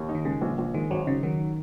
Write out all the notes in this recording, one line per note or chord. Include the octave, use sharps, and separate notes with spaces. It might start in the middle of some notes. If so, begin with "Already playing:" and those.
Already playing: D#2
D#4
D#3
C#3 G#3
A#1
A#1
D#3 G#3
G#1 F#3
C#3 D#4
D#3 F#3